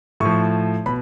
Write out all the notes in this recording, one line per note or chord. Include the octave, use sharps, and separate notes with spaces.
A2 F3 C#6
B2 B5